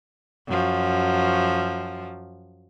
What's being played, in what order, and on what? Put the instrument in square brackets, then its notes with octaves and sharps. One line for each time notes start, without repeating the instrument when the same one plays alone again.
[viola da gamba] F#2 F3